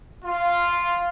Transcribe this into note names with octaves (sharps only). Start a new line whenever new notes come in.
F4